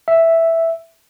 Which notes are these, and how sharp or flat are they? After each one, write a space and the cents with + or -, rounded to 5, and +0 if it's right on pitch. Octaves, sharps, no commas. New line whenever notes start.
E5 +0